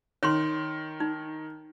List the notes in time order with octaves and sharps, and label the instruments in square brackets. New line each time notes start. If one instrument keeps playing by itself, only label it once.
[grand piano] D#3 [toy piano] C#5 C6
[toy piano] D#4